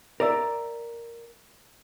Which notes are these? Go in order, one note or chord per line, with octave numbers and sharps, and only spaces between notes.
A#4 D5 E5